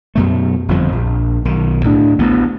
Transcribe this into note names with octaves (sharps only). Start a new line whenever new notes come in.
F#2 B2 A3
G1 F2 F3
A#1
B1 D#3
D2 A2 D4
A1 D2 B3